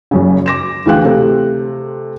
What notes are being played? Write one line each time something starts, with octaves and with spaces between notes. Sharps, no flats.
F#1 F#2 C#3
D6 A#6 E7
D2 E3 G#4 F5 G5 F#6
C3 A3 A4 C5